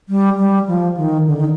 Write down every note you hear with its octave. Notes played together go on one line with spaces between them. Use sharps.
G3
G3
F3
D#3
D3
D#3